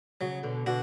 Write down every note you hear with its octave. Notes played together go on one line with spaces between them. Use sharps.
C#3 F#3
B2 D3
B2 D3 F#4